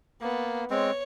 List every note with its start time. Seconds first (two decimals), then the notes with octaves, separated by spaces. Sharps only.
0.21 A#3 B3
0.70 G#3 C4 C#5